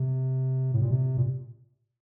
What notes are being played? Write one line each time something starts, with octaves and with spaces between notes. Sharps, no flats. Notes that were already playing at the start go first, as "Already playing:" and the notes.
Already playing: C3
A2
A#2
C3
A#2